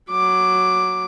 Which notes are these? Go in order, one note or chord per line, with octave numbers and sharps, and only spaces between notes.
F#3 D6